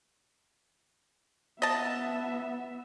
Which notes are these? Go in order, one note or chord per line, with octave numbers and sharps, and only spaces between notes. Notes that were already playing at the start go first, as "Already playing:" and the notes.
B3 D#5 E5 A5